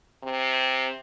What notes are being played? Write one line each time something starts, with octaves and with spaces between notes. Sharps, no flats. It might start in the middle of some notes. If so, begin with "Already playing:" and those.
C3